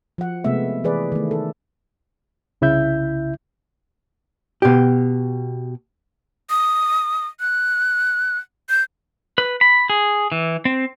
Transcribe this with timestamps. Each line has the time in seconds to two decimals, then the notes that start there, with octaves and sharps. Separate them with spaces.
0.18 F3 F#5
0.44 C3 G#3 A3 B3 E5
0.84 E3 G#4 B4 D5
1.12 D#3 A3
1.31 A4
2.61 C2 C#3 E4 E5 G6
4.62 B2 G4
6.50 D#6
7.40 F#6
8.70 G6
9.38 B4
9.61 B5
9.90 G#4
10.32 E3
10.65 C4